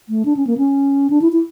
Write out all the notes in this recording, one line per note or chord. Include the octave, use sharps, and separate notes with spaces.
A3
D4
C#4
A#3
C#4
D4
E4
E4